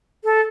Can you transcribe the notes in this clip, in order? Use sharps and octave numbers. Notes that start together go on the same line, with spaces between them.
A4